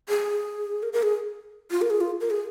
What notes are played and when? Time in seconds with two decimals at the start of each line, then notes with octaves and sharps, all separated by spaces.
0.09 G#4
0.83 A#4
0.93 A#4
1.03 G#4
1.71 F4
1.82 A#4
1.90 G#4
2.01 F4
2.21 A#4
2.30 G#4